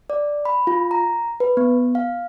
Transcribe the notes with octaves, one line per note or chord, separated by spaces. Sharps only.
D5
B5
F4
A#5
B4
B3
F5